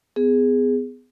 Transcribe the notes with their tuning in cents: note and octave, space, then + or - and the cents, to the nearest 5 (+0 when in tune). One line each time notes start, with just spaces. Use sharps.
B3 +30 G#4 -5